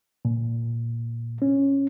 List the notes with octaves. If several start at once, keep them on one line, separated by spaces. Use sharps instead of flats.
A#2
C#4